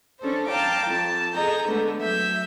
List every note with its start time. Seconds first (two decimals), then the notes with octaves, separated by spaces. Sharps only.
0.20 C#4 D4 A4 C5
0.49 F5 G5 A5 A#5 D6
0.87 F2 A5
1.34 G#4 A4 D#5 A#5 G6
1.67 D3 G#3 A3 B3
1.99 F#3 E5 G6